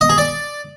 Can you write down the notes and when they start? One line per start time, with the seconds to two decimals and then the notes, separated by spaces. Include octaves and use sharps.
0.01 D#5
0.09 G#4
0.18 D5